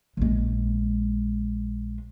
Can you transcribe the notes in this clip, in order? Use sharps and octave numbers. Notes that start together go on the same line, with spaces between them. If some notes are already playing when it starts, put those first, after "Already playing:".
A#1 G#3